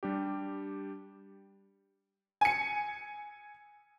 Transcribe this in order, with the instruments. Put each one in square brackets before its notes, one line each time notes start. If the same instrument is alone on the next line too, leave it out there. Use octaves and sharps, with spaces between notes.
[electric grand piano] G3 D4 G4
[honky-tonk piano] G#5 C#7